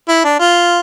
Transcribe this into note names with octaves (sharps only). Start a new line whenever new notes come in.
E4
D4
F4